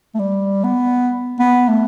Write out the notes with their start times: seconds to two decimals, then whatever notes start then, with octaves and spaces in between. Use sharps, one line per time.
0.15 A3
0.19 G3
0.64 B3
1.40 B3
1.69 A3